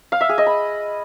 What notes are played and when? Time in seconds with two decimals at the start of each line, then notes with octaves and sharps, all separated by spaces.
0.12 F5
0.21 E5
0.29 G#4
0.38 D#5
0.46 B5